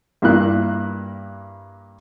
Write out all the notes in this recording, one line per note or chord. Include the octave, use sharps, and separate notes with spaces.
G2 A#3 E4 F#6